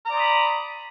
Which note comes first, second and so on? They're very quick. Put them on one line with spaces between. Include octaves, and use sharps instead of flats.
A#5 D5 C5 D#6 B5